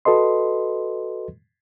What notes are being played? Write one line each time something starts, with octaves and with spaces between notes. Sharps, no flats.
F#4 A4 B4 D#5 C6